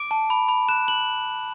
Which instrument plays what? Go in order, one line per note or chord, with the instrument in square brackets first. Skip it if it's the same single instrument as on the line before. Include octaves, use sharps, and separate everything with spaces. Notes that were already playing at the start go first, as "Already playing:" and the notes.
Already playing: [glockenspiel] D6 D7
A5
B5
B5
F#6 E7
F#6 F#7